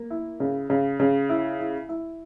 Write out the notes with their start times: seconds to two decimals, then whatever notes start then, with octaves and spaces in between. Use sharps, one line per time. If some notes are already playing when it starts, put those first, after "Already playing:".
Already playing: A#3
0.10 E4
0.40 C#3
0.70 C#3
1.00 C#3
1.29 E4
1.60 E4
1.89 E4